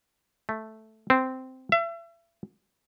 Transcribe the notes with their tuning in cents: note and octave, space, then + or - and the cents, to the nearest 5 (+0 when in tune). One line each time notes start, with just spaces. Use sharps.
A3 -5
C4 -10
E5 +35